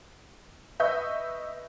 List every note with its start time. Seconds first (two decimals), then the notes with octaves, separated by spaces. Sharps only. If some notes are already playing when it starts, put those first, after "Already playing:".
0.79 B4 D#5 E5 C#6 D#6 G6